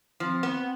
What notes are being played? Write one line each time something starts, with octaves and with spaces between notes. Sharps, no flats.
F3 C4
B3